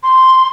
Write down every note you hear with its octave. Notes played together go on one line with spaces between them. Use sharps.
C6